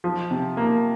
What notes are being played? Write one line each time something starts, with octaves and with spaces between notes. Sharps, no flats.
F3
C3
A#3